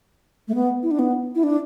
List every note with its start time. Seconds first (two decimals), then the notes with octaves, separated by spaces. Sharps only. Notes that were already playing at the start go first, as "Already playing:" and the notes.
0.48 A3
0.55 B3
0.83 E4
0.91 D4
0.99 B3
1.35 E4
1.43 D4